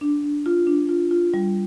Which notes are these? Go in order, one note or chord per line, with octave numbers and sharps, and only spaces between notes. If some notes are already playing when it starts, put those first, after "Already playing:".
D4
D4
F4
D4
F4
F4
G3